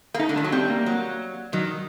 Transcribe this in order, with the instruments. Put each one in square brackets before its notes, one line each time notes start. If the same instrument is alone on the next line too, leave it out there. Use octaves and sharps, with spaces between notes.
[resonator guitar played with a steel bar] A#3
[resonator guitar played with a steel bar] A3 [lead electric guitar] D#4
[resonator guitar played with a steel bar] D3
[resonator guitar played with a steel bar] D#3 [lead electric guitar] D4
[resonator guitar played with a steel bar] F#3
[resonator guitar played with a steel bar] G3 [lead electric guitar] C4
[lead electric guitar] A#3
[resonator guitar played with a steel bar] F#3
[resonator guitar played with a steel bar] D#3 [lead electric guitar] F#3